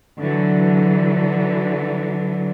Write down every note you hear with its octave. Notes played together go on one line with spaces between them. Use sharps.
D3 E3 F#3